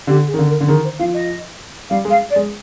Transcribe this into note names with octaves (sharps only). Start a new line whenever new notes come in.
D3 G4
G#4
D#3
D3
A#4
D3
D#3 G#4
C5
F3 F5
D#5
G3 F5
G#3
F5
D5
G#3